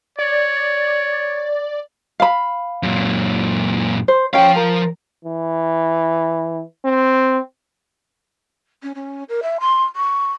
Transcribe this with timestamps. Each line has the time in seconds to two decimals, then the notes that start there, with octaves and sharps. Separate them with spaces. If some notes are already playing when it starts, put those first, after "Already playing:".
0.19 C#5 D5
2.20 F5 B5
2.83 F#2 A#2
4.08 C5
4.34 F3 C#4 F5 G5
4.56 A#4
5.25 E3
6.84 C4
8.83 C#4
8.95 C#4
9.29 A#4
9.43 E5
9.60 C6
9.96 C#6